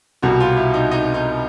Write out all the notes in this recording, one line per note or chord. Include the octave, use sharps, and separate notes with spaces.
C2 B2 G3 F#4
F4
E4
D#4
D#4
D#4